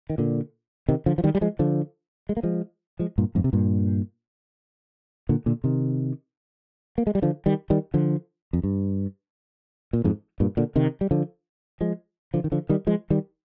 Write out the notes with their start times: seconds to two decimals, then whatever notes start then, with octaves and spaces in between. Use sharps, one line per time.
0.10 D#3
0.18 A#2 D3
0.89 C3 D#3
1.06 D3 F3
1.18 F3
1.24 D#3 G3
1.35 G3
1.41 F3 G#3
1.59 D3 F3
2.29 G#3
2.37 A#3
2.43 F3 G#3
2.99 F3 G#3
3.18 G2 A#2
3.35 F2 G#2
3.44 C3
3.53 G2 A#2
5.29 A#2 D3
5.46 A#2 D3
5.64 C3 D#3
6.98 A#3
7.07 G#3
7.15 G3
7.22 D3 F3
7.46 D#3 G3
7.70 D#3 G3
7.94 D3 F3
8.53 F2
8.64 G2
9.93 A#2
10.04 F2 G#2
10.40 G2 A#2
10.57 A#2 D3
10.76 C3 D#3
11.01 G3
11.11 D3 F3
11.81 F3 G#3
12.34 D3 F3
12.44 D#3
12.52 D3 F3
12.69 D#3 G3
12.87 F3 G#3
13.10 D#3 G3